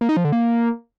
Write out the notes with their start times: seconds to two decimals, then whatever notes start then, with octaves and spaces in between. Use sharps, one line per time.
0.01 A#3
0.09 D#4
0.17 F3
0.25 D3
0.32 A#3